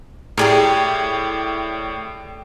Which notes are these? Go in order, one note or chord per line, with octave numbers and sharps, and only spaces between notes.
A2 G4 G#4 A#4 D5